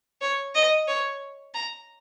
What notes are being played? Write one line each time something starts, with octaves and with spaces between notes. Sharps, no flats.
C#5
D#5
C#5
A#5